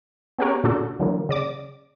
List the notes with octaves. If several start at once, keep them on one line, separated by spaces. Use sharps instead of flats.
B3 C#4 G4 G#4 A#4 C#5
A#2 C#3 D4 F#4 A4
D3 E3 F#3 A#3
C#3 D5 D6